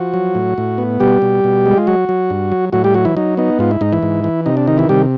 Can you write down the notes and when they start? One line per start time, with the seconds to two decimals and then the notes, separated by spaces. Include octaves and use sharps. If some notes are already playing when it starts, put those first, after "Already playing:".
Already playing: F3 F#4
0.14 F#3
0.35 A2
0.58 A2
0.78 B3
1.00 B2 G3 G4
1.22 B2
1.44 B2
1.66 G#3
1.78 F4
1.87 F#3 F#4
2.09 F#3
2.30 G2
2.52 F#3
2.73 A2 F#3 F#4
2.84 G3 G4
2.94 F#3 F#4
3.05 E3 E4
3.17 F#3 D#4
3.37 B3 D#4
3.59 G#2 F4
3.71 E4
3.81 G#2 D#4
3.93 E3 E4
4.03 G#2
4.24 E3
4.46 C3 D#4
4.57 D4
4.67 D#3 D#4
4.78 E3 E4
4.89 C3 G3 G4